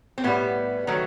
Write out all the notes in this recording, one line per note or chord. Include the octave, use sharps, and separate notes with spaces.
C4
A2 G3 B3
D#3 F#3 A3